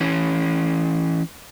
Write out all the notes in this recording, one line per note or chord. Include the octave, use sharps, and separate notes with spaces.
E3 C#4